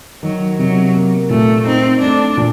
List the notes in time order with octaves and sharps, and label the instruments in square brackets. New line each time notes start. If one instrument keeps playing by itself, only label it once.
[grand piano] D#3 [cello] F#3
[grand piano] C3 [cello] F#3
[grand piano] A#3
[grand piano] A#2 [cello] A3
[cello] C4 [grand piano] D#4
[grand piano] A3 [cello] D4
[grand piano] A#2